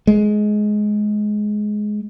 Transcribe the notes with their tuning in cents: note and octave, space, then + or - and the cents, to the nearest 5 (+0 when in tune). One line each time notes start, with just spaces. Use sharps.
G#3 +15